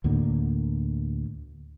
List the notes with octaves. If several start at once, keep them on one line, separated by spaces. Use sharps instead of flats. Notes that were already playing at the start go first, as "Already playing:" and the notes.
D2 A2 D3 A#3